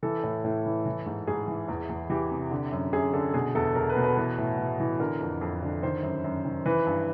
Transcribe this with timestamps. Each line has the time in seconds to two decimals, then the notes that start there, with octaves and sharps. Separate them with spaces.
0.03 E3 A4
0.24 A2
0.44 A2
0.66 E3
0.85 E3
1.06 G#2
1.27 G#2 G#4
1.48 E3
1.68 E2
1.89 E2
2.10 E3 G4
2.31 C3
2.51 D3
2.72 F#2
2.93 F#2 G#4
3.13 D3 A4
3.34 B2 G#4
3.55 E2 A4
3.75 E2 A#4
3.90 B4
3.97 B2
4.03 B4
4.17 E3 B4
4.38 A2
4.58 A2
4.80 E3
5.00 D3 A#4
5.21 F2
5.41 F2
5.62 D3
5.83 D#3 C5
6.03 F#2
6.24 F#2
6.45 D#3
6.66 E3 B4
6.87 G2